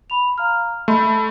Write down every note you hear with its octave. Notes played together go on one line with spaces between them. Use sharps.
B5 F7
F5 A#5 F6
A3 D#5 B5 C6